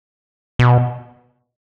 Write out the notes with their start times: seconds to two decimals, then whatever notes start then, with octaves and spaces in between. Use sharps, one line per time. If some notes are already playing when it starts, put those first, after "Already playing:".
0.59 B2